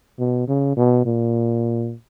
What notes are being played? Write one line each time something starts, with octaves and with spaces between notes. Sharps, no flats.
B2
C#3
B2
A#2